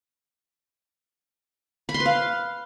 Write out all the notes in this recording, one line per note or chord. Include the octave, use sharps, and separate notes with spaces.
B5
C6
B4
F5